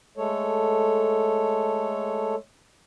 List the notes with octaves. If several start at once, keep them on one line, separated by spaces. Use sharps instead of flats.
G#3 A3 A4 C#5